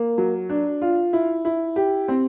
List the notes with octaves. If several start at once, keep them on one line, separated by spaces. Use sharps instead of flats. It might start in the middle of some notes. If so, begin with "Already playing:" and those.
Already playing: A#3
F#3
D4
F4
E4
E4
G4
C4